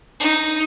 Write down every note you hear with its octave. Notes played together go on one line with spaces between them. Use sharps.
D#4